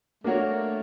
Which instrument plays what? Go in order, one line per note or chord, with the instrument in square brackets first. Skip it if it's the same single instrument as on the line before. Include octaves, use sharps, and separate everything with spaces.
[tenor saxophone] A3 [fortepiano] A#3 D4 F#4 A#4 C#5